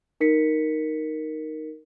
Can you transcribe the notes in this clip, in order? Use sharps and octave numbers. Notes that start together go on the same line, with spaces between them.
D#4 A#4 B6 C#7